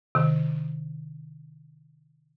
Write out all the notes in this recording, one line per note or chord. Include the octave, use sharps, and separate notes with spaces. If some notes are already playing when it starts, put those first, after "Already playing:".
C3 D#3